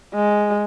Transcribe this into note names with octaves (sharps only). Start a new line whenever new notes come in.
G#3